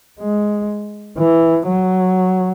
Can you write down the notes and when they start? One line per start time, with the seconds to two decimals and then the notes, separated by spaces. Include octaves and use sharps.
0.19 G#3
1.17 E3
1.68 F#3